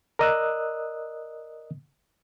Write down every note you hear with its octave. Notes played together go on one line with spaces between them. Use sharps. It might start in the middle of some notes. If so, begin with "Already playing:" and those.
A#4 D5 D#5 D#6 E6 F#6